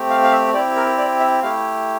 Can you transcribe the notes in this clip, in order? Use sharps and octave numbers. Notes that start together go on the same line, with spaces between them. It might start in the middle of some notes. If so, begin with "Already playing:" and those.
Already playing: A3 C4 G4
F5
F5
E5
C4 E4 G4 D5
A#4
D5
E5
A3 E4 G4 F5